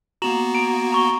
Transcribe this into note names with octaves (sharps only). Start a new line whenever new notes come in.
A#3 B3 F#4 A#5 E7 F#7
A#5 D7
A#5 C#6 G7